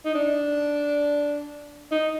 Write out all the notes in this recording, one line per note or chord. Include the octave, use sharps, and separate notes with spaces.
D#4
D4
D#4